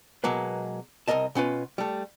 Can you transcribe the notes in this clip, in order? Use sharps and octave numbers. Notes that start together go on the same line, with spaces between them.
B2 F#3 G#3 A#3 B4
C2 C#3 A#4 D#5 A5
B2 C#4 F4 B4
G3 A3